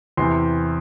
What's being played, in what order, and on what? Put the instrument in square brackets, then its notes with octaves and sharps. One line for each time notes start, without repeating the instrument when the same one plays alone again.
[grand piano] E2 C3 E3 C6